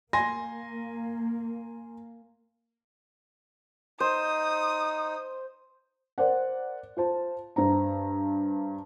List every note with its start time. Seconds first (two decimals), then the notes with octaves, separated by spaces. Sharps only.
0.13 A#3 G#5 C6 A#6
4.00 D#4 C5 D#6
6.18 A#4 C5 D5 F#5
6.97 F4 C5 A5
7.56 G2 C5 A#5